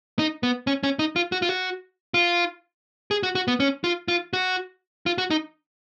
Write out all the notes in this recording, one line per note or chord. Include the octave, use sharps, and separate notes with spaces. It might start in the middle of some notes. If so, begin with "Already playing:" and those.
D#4
B3
C#4
C#4
D#4
F4
F#4
F4
F#4
F4
G#4
F#4
F#4
B3
C#4
F4
F4
F#4
F4
F#4
D#4